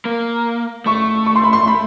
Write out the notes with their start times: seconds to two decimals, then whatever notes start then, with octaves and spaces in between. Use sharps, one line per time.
0.05 A#3
0.86 A3 C#6
1.26 C#6
1.36 C6
1.44 B5
1.53 C6
1.67 B5